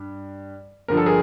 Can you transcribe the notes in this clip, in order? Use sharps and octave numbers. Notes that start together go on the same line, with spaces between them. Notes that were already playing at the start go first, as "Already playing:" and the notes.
Already playing: G2
G2 D3 F3 A#4
A4
G#4 A#4